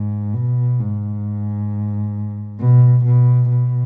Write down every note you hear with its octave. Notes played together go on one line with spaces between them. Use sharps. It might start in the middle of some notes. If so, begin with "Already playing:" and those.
Already playing: G#2
B2
G#2
B2
B2
B2